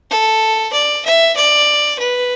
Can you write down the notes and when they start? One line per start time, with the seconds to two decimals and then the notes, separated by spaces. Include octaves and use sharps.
0.10 A4
0.73 D5
1.05 E5
1.36 D5
1.99 B4